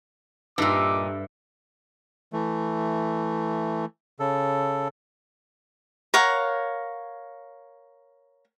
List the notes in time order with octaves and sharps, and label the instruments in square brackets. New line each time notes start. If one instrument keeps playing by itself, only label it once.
[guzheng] G2 [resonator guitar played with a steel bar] A#2 D#4 [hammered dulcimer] A4 E5 [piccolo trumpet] D6
[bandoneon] E3 A3
C#3 A4
[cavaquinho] A#4 C#5 F5 F#5